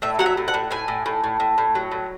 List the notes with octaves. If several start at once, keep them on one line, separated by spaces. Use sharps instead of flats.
A2 E5
F#3 F#5
E5
A2
F#5
A2
A2 G#5
A2
A2
A2
A2
A2
F#3
A2